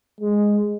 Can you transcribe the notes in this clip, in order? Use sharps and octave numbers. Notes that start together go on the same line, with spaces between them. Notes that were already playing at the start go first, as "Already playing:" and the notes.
G#3